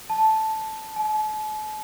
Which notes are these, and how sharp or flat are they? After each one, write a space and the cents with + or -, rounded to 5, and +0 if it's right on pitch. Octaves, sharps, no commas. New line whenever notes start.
A5 -5
A5 -45